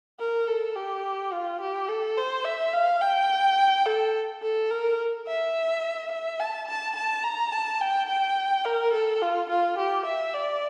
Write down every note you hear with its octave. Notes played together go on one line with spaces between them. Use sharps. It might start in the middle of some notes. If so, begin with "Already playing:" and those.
A#4
A4
G4
F4
G4
A4
C5
E5
F5
G5
A4
A4
A#4
E5
E5
A5
A5
A5
A#5
A5
G5
G5
A#4
A4
F4
F4
G4
E5
D5